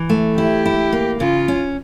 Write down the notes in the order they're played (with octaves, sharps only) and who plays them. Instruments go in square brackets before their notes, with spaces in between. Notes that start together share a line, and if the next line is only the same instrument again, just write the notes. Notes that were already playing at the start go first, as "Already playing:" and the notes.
Already playing: [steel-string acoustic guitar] E3
A3
[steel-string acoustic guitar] E4 [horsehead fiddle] G4
[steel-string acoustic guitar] E4
A#3
[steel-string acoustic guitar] C#3 [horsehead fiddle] F4
[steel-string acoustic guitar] C#4